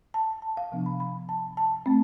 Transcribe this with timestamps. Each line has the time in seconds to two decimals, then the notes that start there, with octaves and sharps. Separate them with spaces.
0.14 A5
0.42 A5
0.57 F5
0.72 C3 F3 B3 D4
0.86 B5
1.00 B5
1.29 A5
1.57 A5
1.86 A3 C4